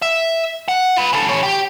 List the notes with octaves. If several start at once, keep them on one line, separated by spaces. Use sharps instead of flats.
E5
F#5
F4 B4
C#3 A4
E3 C#5
G4